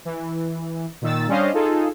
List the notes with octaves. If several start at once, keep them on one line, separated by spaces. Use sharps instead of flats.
E3
A#2 D#3 E6 A6
G3 C#4 D4 C5 D#5 F5
D#4 F4 G#4 A4